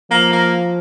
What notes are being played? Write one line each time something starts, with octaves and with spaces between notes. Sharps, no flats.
F3 A#3
A#3